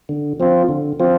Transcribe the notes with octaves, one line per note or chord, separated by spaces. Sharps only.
D3
F3 C4 F4
D3
F3 C4 F4